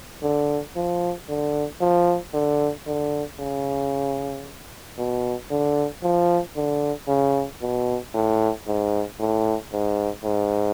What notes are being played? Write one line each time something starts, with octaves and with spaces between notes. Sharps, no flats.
D3
F3
D3
F3
D3
D3
C#3
B2
D3
F3
D3
C#3
B2
A2
G#2
A2
G#2
G#2